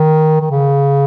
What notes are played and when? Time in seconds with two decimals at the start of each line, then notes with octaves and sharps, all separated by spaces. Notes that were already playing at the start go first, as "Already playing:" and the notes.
Already playing: D#3
0.41 D#3
0.51 C#3